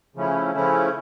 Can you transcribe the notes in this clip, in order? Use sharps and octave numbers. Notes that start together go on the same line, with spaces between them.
C#3 F3 A3 C#4 E4
C#3 F3 A3 C#4 E4